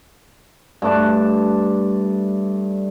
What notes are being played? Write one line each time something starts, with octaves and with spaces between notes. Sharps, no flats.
G2 A3 D4 A5